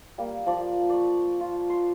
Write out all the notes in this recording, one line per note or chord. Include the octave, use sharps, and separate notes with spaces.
G3 A#3
F3 D5
D5 C#6
F4
C6